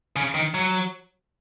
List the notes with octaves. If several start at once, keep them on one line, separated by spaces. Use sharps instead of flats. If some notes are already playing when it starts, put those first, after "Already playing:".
C#3
D#3
F#3